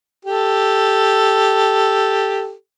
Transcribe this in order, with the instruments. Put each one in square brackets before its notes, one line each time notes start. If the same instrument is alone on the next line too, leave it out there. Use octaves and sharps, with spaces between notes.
[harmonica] G4 A4